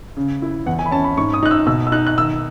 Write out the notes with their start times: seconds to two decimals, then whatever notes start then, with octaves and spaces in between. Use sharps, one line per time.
0.17 C#3
0.42 E4
0.66 E2 F#5
0.79 G#5
0.86 B5
0.91 C#4 A5
1.04 B5
1.17 G#2 C#6
1.33 D#6
1.43 D#4 F#6
1.51 E6
1.66 B2 E6
1.87 E6
1.92 D#4 F#6
2.07 F#6
2.17 D#3 E6